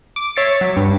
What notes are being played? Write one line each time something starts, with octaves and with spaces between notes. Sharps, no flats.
D6
C#5 E5 A6 C7 C#7
F#3
G2